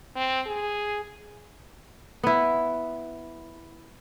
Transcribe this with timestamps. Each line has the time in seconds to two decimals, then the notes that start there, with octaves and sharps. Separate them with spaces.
0.16 C4
0.46 G#4
2.23 B3 E4